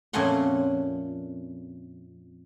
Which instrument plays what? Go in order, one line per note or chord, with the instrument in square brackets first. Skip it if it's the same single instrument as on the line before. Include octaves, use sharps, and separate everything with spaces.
[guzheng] F2 A#2 A3 C#4 F#5 C6